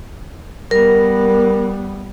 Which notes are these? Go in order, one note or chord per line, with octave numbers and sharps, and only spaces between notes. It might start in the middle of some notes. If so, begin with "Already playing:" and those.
G3 B3 A#4